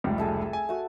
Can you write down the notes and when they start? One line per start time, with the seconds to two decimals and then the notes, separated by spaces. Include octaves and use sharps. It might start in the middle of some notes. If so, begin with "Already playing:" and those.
0.04 F1 C#2 G3
0.18 G#4 A4 E5
0.53 G#5
0.69 A3 F#4